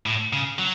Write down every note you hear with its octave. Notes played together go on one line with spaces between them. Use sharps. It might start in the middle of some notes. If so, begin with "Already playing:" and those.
A2
C#3
F#3